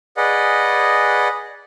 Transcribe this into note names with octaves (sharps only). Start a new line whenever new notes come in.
G#4 B4 D5 D#5 F#5